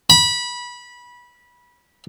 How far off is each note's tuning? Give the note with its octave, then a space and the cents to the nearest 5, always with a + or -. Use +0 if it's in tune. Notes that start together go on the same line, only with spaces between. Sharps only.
B5 -20